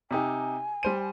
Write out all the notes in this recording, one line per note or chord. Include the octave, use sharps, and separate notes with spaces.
C3 D#4 G4 G#5
G3 C5 D#7